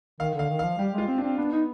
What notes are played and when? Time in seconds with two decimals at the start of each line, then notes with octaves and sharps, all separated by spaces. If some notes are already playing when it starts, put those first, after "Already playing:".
0.20 D#3 F5
0.34 D3 F5
0.50 D#3
0.59 F5
0.63 F3
0.78 G3 G4
0.94 G#3 F4
1.08 C4
1.18 D4
1.23 C4
1.38 B3 D4
1.52 D#4